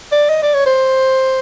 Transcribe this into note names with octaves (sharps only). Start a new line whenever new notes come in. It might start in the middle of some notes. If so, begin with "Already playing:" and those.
D5
D#5
D5
C#5
C5